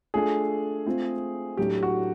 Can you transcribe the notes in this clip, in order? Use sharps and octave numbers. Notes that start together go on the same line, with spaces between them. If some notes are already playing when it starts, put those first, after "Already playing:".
A3 D4 F4 G#4 A4
A3 C4 F4
A2 F#3 A3 D4 G4
F#4